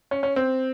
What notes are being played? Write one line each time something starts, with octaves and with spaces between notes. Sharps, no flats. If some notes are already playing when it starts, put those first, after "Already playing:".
C#4
C#4
C4